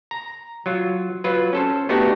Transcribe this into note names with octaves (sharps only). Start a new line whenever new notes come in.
A#5
F#3 F4
F#3 F4 B4
C#4 A4 C5
A3 B3 D4 D#4 F#4 G4